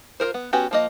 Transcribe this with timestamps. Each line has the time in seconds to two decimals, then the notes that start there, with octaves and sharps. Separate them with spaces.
0.20 F4 G#4 A#4 C5
0.34 B3
0.53 B3 C#4 F#4 G4
0.71 F3 A#3 D#5